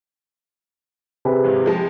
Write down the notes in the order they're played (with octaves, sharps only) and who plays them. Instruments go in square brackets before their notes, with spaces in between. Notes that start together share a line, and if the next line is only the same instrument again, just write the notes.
[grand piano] C3 G#4 B4
[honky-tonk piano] G#1 E2 G#2
F3 G#3 A5